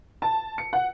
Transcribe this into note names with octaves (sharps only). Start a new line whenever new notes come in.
A5
C#7
F#5